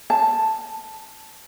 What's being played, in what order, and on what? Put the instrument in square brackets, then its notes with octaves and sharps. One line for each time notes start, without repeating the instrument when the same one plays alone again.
[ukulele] A5